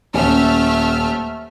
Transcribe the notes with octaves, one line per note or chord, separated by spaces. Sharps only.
D#1 A3 C#4 E5 F6